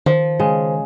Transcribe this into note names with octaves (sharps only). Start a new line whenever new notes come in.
D#3 F3
C#3 G#3